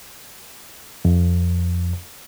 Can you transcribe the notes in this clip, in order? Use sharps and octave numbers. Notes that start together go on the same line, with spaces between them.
F2